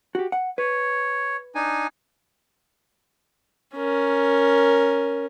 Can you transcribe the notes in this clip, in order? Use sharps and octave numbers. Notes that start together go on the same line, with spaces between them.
F#4 G4
F#5
B4 C#5
D4 D#4 G#5
C#4 A#4